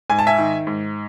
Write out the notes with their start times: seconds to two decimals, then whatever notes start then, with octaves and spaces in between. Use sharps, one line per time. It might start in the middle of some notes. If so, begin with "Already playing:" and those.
0.10 G#2 G#5
0.19 A5
0.27 E5 G#5
0.38 D#3
0.67 G#2